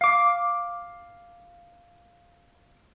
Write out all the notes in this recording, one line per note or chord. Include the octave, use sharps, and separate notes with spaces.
F5 D6